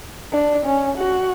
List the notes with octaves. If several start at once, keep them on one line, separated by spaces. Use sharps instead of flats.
D4
C#4
F#4